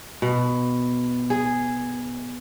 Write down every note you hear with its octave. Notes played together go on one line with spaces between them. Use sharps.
B2
G#4